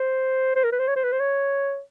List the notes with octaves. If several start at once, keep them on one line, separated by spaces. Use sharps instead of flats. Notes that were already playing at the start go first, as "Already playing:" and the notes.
Already playing: C5
C5
A#4
B4
C5
C#5
C5
B4
C5
C#5